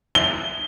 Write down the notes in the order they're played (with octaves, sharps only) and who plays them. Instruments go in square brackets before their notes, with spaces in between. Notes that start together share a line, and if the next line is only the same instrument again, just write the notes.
[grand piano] G7